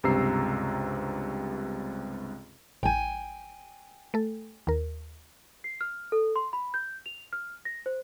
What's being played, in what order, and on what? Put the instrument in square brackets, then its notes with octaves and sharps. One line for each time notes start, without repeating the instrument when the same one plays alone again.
[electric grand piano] C#2 G2 C3 A#5 E6 C7
[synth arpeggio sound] A1 [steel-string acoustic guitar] G5 G#5
[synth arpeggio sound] A3 A4
D#2 A#4
[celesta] C7
F6
A4
C6
B5
G6
F7
F6
A#6
C5